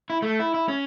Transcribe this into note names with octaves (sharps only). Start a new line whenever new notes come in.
E4
A3
E4
E4
C#4